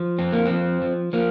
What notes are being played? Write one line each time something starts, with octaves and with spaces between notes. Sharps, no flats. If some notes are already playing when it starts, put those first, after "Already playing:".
Already playing: F3
F2 C4
A#3
F3 C4
F3
F3 A#3